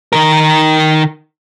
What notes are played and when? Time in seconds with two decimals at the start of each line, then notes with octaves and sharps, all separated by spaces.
0.13 D#3 A#4